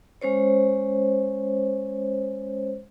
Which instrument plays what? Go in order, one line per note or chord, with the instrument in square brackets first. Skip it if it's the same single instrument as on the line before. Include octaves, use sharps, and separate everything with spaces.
[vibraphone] G#3 C#4 C5 C#5